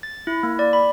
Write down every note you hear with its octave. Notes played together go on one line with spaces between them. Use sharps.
A6
E4
A#3
D5
B5